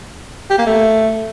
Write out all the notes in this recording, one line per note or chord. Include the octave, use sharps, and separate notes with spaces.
G4
A#3
A3